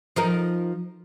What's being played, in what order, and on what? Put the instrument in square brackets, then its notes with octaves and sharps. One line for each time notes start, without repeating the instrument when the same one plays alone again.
[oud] F3 D#4 A#4